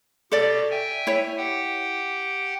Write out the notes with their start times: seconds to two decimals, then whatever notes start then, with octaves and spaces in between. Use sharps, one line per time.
0.32 B2 G4 A4 D5
0.71 E5 G5 G#5
1.07 E4 C#5
1.37 G4 F#5 G5